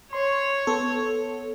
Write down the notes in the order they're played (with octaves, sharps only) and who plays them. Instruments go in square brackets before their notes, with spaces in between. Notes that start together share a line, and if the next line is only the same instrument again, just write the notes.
[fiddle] C#5 [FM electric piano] C6
[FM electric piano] B3 A4